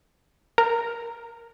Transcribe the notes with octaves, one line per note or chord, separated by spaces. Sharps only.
A#4